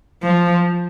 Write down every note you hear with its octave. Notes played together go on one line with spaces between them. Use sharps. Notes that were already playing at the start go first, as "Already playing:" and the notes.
F3